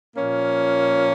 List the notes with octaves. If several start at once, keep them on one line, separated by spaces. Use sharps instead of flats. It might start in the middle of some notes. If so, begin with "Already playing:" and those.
A#2 F3 A#3 C#4